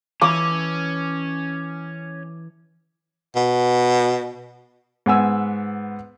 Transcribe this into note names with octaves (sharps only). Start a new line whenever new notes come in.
E3 C#4 D6
B2
G#2 B3 G#5 E6